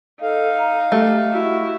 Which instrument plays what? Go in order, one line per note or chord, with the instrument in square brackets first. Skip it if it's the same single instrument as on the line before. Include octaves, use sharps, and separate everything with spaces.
[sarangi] D#4 [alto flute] A4 [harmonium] F5
[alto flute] A#5
[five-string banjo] A3 [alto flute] G4
[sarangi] E4 [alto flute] F#4